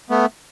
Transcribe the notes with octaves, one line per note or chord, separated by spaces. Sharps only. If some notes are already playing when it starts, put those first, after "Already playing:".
A3 B3